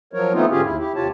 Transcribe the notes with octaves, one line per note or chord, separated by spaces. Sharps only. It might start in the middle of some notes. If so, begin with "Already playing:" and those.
F3 F#3 A#4 C#5
E3 A3 B3 C4 D#4 F4
G#2 D3 C#4 F4 G4 G#4
D#2 E4
E4 G4
D#2 C3 F4 G4 C#5 A5